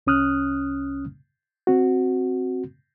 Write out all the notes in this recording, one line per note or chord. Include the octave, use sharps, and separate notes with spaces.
C2 C#4 D#6 F6 F#6
C4 F#4